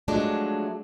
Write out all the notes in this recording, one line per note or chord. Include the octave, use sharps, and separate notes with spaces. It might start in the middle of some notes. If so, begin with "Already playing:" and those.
F3 F#3 G#3 A3 D4